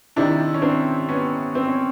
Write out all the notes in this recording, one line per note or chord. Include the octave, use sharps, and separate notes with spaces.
C3 D#3 D4 E4
C#4
C4 D4
B3 C#4
C4
C#4